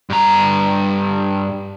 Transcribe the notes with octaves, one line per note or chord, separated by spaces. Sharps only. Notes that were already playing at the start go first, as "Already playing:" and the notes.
G2 A#5